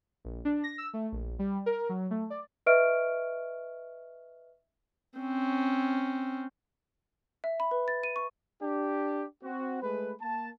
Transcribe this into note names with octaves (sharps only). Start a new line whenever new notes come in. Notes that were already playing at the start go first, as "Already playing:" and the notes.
A#1
D4
A#6
E6
A3
A#1
G3
A#4
F#3
A3
D5
B4 D#5 E5 C#6 F6 D7
C4 C#4
E5
B5
B4
A6
D#7
C#6
D4 G4
C4 F#4
G#3 A3 B4
A#3 A5